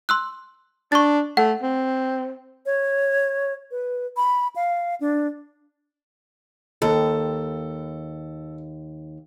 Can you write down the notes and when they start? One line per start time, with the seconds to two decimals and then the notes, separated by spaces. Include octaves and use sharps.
0.09 C6 E6 F#6
0.92 D4 C#6 A6
1.37 A3 F#5
1.62 C4
2.66 C#5
3.71 B4
4.17 B5
4.56 F5
5.01 D4
6.82 D#2 A4